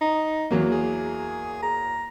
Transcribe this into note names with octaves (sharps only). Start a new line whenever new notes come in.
D#4
E2 F#3 A#3
G#4
A#5